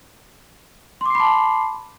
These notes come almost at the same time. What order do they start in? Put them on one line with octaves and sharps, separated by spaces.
C6 D6 C7 B5 A5